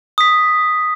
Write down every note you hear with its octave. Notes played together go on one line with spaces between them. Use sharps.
D#6 B6